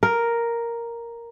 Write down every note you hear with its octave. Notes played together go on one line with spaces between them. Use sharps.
A#4